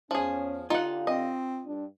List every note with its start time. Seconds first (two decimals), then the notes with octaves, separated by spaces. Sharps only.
0.11 E2 F3 C#4 G#4
0.70 D3 D#4 F4 G4 F5 F#5
1.07 C4 D#5
1.66 G2 D4